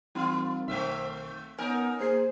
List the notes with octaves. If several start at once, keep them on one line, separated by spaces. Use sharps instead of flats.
E3 G3 A#3 C4 D#4 F4
B1 D#3 A3 C4 E5
B3 C#4 D#4 A#4 G#5
A#3 G#4 C5 C7